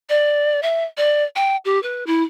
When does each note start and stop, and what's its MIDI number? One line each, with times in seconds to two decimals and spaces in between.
0.09 0.60 74
0.63 0.84 76
0.97 1.24 74
1.36 1.56 79
1.65 1.81 67
1.83 2.04 71
2.06 2.23 64